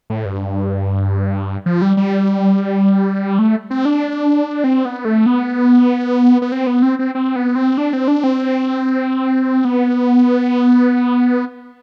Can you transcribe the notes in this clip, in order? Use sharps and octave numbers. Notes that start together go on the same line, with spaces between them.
A2
G2
F3
G3
G3
A3
C4
D4
C4
B3
A3
B3
B3
C4
B3
C4
C4
C4
B3
C4
D4
C4
D4
C4
B3